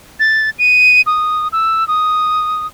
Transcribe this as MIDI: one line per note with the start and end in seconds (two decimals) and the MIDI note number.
0.20 0.50 93
0.59 1.01 99
1.07 1.48 87
1.52 1.87 88
1.88 2.67 87